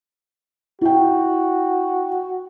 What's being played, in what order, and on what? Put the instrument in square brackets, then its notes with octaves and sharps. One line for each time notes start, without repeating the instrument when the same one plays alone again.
[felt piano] E4 G5 [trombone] F#4